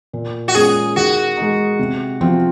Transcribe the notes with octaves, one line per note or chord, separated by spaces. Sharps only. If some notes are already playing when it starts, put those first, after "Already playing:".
A#2
F#4
G#3 C#4 F4 G#4
D#3 F#4
G#3 D#4
C3
F3 C4 F4